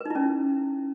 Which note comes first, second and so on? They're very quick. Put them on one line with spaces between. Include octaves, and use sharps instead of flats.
B4 D#4 E4 C#4